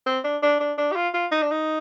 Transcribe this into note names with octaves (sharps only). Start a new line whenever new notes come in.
C4
D4
D4
D4
D4
G4
F4
F4
D#4
D4
D#4